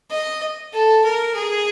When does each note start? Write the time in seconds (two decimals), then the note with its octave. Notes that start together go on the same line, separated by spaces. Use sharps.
0.10 D#5
0.73 A4
1.04 A#4
1.35 G#4